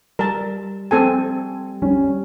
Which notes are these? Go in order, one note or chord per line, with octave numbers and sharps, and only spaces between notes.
G3 A#4 A5
C4 A4 G#5 A5
G3 C#4